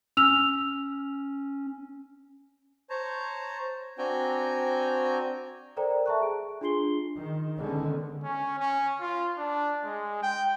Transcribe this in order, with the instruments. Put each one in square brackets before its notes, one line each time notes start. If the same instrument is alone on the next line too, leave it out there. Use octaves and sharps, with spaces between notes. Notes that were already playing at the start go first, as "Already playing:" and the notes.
[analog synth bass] C#4 [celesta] E6 F6 F7
[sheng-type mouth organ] C5 C#5 A5 A#5
C4 D4 F#4 G5 G#5 A#5
[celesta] A4 A#4 C5 D5 G5 A#5
E5 A5 A#5 C#6 F#6
G#4 D7
D4 F4 G#4 C6 C7 G7
[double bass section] D#3
D3 D#3 G#3 B3 C#4
[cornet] C#4
C#4
F4
D4
G#3
G5